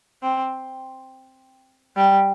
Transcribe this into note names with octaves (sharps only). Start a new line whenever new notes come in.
C4
G3